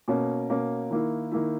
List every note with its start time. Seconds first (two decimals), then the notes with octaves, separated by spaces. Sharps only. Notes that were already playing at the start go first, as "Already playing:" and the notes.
0.08 B2 A#3 C#4
0.49 B2 A#3 C#4
0.91 D#3 A#3 E4
1.31 D#3 A#3 E4